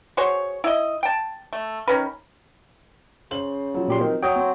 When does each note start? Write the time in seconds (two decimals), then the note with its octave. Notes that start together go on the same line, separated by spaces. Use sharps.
0.17 F#4 G#4 C5 C#5
0.64 E4 D#5
1.03 G5 A5
1.53 A3
1.88 D#3 C#4 A#4 B4
3.31 C#3 C5 F#7
3.74 F3 F#3
3.88 A#2 G4 C6
4.00 D#3 C4
4.23 F#3 C#5 G5 D#6
4.36 C4